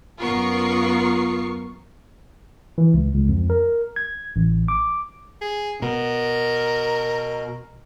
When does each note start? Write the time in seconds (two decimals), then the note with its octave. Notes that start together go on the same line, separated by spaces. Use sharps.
0.21 F#2 B3 F4 A#4 C#6 C7
2.78 E3
2.94 C#2
3.15 C#2
3.29 F2
3.50 A#4
3.96 G#6
4.36 A1
4.68 D6
5.41 G#4
5.82 B2 A#4